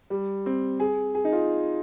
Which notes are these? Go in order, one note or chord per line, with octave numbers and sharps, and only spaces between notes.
G3
C4
G#4
G#4
D#4
F4